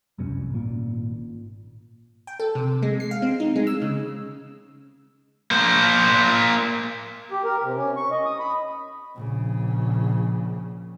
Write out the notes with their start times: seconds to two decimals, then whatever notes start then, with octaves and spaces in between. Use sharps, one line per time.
0.18 F1 C2 F#2 C#4
0.50 G#1 A#2
2.27 G5
2.40 A4
2.55 C3
2.83 G#3
3.00 C7
3.11 F5
3.22 C4
3.40 D#4
3.56 G#3
3.67 E6
3.82 C#3
5.51 A#3 C5
7.31 G4
7.44 A#4
7.63 C3
7.76 C#4
7.97 C#6
8.11 D#5
8.25 D#6
8.39 B5
9.16 A#1 C#3